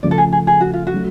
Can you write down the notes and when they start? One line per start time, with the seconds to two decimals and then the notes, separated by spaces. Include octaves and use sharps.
0.03 C#3 F3 A3 D5
0.11 A4
0.18 G#4
0.32 G#4
0.47 G#4
0.61 F#4
0.73 F4
0.87 F#4
0.94 F#3 A3